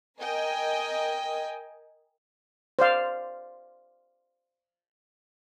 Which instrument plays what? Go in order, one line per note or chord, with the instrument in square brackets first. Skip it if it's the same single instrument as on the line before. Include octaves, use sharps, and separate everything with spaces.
[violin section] A#4 D#5 G5 G#5
[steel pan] C5 D5 F5